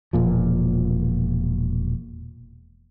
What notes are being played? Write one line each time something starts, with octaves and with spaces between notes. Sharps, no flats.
E1 A#2 F3